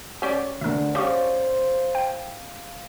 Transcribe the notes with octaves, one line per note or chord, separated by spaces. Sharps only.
G3 C#4 D5
D2 G#2 D3 A#4 E5
C#3 G3 C5 F5 C#6 D6 G6
G5